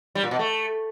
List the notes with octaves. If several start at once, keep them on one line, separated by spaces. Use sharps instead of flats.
G3
A#2
B2
A3